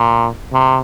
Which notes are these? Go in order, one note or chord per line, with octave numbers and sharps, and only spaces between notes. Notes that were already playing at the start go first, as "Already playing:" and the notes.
Already playing: A#2
C3